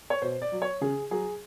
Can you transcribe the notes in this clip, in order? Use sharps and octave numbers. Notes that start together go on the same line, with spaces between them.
C#5
B2 C5
D5
F#3
C#5
C#3 G#4
F#3 G#4